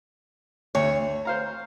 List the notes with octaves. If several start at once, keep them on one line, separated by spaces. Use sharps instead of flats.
D2 C#5
C5 F5 A#5